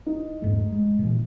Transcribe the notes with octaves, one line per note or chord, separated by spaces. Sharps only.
D#4
E2 G#2 A3
G#3
A#2 E3